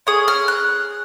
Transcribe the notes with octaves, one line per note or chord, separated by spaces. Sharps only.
C#4 G#4 D#6
F6
F#6